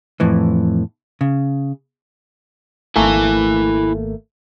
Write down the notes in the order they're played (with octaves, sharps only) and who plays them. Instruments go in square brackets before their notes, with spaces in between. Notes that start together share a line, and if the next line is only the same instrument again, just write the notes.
[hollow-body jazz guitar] F2 A2 E3
C#3
[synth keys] G#1 A3 A#3 [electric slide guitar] E4 G#5